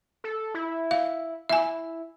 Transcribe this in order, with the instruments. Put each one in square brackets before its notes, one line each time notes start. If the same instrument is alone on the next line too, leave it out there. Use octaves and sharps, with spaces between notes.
[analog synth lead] A4
E4
[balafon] F5
[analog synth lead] E4 [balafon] E5 G#5